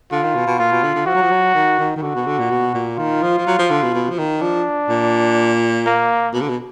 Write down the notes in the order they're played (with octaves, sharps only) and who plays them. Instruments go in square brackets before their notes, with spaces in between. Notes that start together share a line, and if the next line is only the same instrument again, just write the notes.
[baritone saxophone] D3 [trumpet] F4
[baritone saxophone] D#3
B2
B2
[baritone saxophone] A#2 [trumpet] F4
[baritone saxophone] B2
D3
D3
[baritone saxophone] F3 [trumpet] F#4
[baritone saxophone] F#3
F3
F#3
D#3
D#3
D#3
[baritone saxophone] D3 [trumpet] F#4
[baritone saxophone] B2
D3
A#2
B2
A#2
[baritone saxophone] D#3 [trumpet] F4
[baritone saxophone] F3
F3
F#3
F3
D3
B2
B2
F3
D#3
[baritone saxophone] F3 [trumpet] D4
[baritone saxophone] A#2
[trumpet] A#3
[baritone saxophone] B2
D3
B2